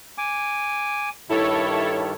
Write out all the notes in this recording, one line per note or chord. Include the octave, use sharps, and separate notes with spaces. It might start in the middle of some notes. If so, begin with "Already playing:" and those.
G#5 D6
G2 D#3 E4 A4 C#5